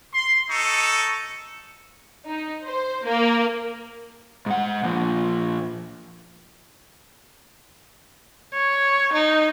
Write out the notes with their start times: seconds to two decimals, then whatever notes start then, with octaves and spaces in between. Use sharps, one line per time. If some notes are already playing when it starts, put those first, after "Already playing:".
0.12 C6
0.50 D#4 A4 C#6
2.27 D#4
2.66 C5
3.05 A#3
4.46 G#2 F#5
4.83 A#2 F3
8.54 C#5
9.13 D#4